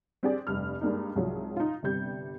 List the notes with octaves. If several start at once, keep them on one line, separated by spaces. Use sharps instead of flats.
C4 D4 G4 G#4 D5
F1 G2 G3 F6
G2 G#3 A#3 D4 D#4
C2 G#2 F3 F#3
D#4 F4
G1 C3 G3 G6